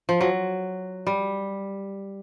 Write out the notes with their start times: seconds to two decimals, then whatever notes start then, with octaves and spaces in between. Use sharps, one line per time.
0.09 F3
0.21 F#3
1.07 G3